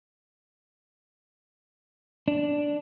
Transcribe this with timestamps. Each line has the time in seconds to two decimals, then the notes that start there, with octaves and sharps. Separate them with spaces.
2.28 D4